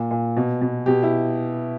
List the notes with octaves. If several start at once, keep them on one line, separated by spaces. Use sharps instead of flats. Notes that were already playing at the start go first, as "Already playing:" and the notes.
Already playing: A#2
A#2
B2
B2
B2 G4
E4